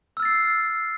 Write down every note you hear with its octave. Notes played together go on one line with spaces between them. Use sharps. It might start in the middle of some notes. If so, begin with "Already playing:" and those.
E6 F6 A6 C7